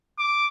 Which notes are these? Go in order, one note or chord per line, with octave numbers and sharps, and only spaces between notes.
D6